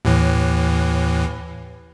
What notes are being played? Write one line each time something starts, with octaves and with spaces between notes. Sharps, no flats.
D#2 A2 E3